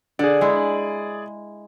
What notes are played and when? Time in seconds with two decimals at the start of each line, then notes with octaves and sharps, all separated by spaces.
0.19 D3 G#4 D5
0.41 G#3 E4